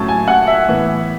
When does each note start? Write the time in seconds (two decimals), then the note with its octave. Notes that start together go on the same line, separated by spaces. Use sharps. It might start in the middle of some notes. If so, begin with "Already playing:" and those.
Already playing: A2 F#3 C#4 A5
0.08 G#5
0.28 F#5
0.47 E5
0.67 A2 E3 B3